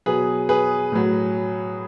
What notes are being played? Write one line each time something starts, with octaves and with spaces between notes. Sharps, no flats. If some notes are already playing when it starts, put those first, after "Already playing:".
B2 F#3 G#4 B4
G#4 B4
A2 F#3